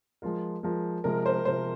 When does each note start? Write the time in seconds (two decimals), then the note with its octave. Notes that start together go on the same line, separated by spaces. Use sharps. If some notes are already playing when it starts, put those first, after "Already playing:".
0.22 F3 G#3 F4 A#4
0.63 F3 G#3 F4 A#4
1.04 C3 F3 G#3 A#4
1.26 C5
1.45 C3 F3 G#3 C5